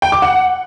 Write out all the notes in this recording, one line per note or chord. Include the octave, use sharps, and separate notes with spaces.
G5
D6
F#5